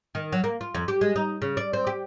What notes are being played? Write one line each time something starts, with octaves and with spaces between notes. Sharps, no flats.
D#3
F#3
A#3
F4
F2
G4
G#3
D#4
C#3
D5
C4
G4